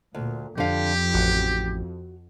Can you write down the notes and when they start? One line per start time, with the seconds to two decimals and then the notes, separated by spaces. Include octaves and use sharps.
0.15 D2 A#2
0.58 F2 D3 G4 F5
1.14 A1 F#4